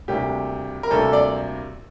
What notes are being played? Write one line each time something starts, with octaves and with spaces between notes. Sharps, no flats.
D2 C3 G3 A#3 G4
A#4
D2 C3 G3 A#3 A4
D5